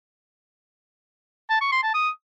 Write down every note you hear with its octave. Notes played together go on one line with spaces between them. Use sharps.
A5
C#6
C6
A5
D#6